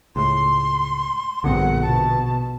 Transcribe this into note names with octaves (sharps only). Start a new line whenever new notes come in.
C#2 A2 C6
A#1 G2 D3 B3 C4 F#5
B2 A5